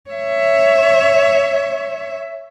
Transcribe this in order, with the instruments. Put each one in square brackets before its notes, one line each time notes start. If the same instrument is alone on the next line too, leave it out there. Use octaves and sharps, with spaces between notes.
[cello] C#5 E5